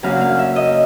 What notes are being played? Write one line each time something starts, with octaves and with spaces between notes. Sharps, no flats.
F#2 C#3 F#3 A#3 D4 F5
F5
E5
D#5